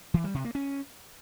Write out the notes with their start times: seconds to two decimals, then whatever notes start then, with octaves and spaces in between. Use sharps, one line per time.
0.14 E3
0.24 G3
0.34 C3
0.45 A#3
0.55 C#4